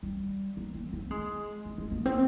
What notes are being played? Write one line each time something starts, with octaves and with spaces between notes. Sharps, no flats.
G3
A#3
C4
C4
G#3
G#3
G#3
A#3
C4